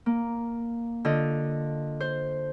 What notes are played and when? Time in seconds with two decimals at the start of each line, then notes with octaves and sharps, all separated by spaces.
0.06 A#3
1.05 D3 F4 D#5
2.00 C5